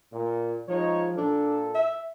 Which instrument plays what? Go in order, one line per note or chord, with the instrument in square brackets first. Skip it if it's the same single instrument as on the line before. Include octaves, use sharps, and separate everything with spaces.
[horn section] A#2
[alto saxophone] F3 [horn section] G#3 D#4 C#5
[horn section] A#2 A4 [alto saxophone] D4
[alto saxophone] E5